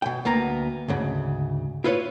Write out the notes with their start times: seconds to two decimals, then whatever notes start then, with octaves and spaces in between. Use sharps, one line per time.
0.02 B2 G5
0.25 D2 A#3 B3 A#5
0.88 D2 G#2 C#3
1.84 E4 F4 B4 C#5